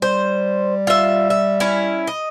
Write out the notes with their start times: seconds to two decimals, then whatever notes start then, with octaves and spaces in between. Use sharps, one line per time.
0.02 G3 C5
0.87 F4 E5
1.30 E5
1.60 C#4 E4
2.07 D#5